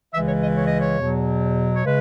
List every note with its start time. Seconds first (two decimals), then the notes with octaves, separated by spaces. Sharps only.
0.13 C#2 C#3 E3 G#3 E5
0.27 C#5
0.42 D#5
0.57 C#5
0.67 D#5
0.80 C#5
0.98 E2 B2 F#3
1.75 C#5
1.84 C#3 G#3 B4